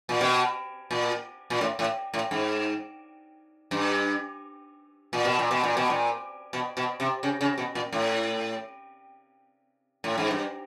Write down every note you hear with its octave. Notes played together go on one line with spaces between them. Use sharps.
A#2
B2
A#2
A#2
A2
A2
A2
G#2
G2
A#2
B2
A#2
B2
A#2
B2
A#2
B2
B2
C3
C#3
C#3
B2
A#2
A2
A2
G#2
G2